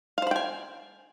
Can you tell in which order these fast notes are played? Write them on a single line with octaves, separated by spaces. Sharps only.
F5 C5 B5 G5 G#5